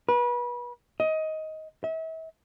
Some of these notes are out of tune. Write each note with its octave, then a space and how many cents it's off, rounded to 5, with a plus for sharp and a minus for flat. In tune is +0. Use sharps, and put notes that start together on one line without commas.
B4 -30
D#5 +15
E5 -40